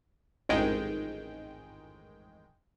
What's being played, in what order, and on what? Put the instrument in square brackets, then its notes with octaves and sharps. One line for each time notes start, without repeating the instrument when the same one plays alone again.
[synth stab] A1 F2 G#2 D#3 G#3 G5